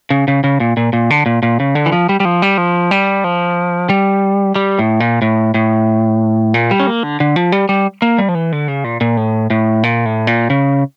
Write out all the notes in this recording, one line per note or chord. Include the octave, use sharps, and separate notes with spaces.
C#3
C#3
C#3
A#2
A#2
A#2
D3
A#2
A#2
C#3
D3
E3
F3
G3
G3
F3
G3
F3
G3
F3
G3
G3
A2
A#2
A2
A2
A#2
G3
C#4
A#3
D3
D3
F3
G3
G3
A#3
G3
F3
E3
D3
C#3
A#2
A#2
A2
A2
A#2
A2
A#2
C#3